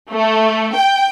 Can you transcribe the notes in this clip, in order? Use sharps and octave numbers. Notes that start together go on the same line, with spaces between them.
A3
G5